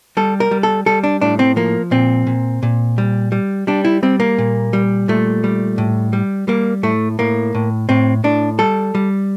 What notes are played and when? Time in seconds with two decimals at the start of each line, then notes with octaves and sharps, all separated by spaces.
0.17 G3 A4
0.40 A#4
0.51 G3
0.63 A4
0.86 G3 A4
1.04 D4
1.21 A2 D4
1.39 C4
1.56 F3 A#3
1.91 A#2 C4
2.27 A#2
2.63 A#2
2.98 G3
3.32 G3
3.67 G3 D4
3.85 E4
4.03 G3 C4
4.20 A#3
4.38 A#2
4.73 G3
5.08 A#2 A3
5.44 G3
5.78 A2
6.13 G3
6.48 G3 A#3
6.83 A2 A3
7.19 A2 A#3
7.55 A2
7.89 A2 C4
8.24 A2 D4
8.59 G3 A4
8.95 G3